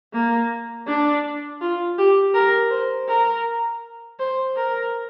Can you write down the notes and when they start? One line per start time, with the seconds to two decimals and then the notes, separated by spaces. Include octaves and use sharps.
0.13 A#3
0.87 D4
1.61 F4
1.98 G4
2.34 A#4
2.71 C5
3.08 A#4
4.19 C5
4.56 A#4